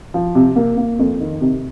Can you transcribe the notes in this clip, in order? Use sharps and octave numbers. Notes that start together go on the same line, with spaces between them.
F3
C3
A#3
A#3
F2
D#3
C3